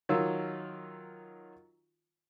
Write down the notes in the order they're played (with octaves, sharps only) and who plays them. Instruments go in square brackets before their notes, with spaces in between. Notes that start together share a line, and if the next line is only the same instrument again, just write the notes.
[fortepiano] D#3 F#3 F4 E6